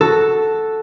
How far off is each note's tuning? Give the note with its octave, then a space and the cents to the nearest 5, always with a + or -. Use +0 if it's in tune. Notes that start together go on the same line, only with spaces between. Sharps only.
F#4 +0 A4 +0